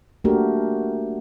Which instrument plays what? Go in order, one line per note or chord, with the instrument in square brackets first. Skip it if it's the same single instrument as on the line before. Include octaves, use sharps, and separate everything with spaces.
[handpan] A3 A#3 D4 F#4 G4 A#4